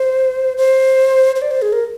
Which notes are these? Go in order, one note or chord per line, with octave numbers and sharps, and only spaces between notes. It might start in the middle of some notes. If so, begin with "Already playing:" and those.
Already playing: C5
C5
C5
D5
C5
G#4
A#4